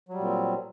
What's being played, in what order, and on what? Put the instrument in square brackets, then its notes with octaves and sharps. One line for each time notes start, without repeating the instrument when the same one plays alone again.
[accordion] F#3
G3
A#2
C4